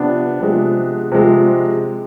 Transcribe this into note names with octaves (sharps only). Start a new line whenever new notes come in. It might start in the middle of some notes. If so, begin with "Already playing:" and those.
Already playing: C3 F3 B3 D4
C3 F3 G#3
C3 F3 G#3